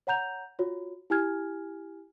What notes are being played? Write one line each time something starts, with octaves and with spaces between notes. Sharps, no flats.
C#5 F#5 A#5 G6 F7
F4 F#4 C#5
E4 G4 G#5 F6 G#6